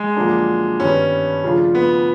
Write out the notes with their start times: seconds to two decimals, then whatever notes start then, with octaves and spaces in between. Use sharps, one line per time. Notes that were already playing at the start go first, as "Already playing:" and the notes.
Already playing: G#3
0.16 F#2 D3 F3 A#3 D4
0.80 G2 D#3 G3 B3 C#4
1.44 C#3 F3 A3 D4 F4
1.75 B3